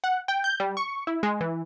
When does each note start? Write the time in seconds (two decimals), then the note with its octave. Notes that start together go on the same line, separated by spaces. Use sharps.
0.04 F#5
0.28 G5
0.44 G6
0.60 G3
0.77 C#6
1.07 E4
1.23 G#3
1.41 E3